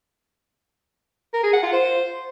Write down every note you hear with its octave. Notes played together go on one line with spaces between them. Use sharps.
A#4
G#4
F#5
F4
C5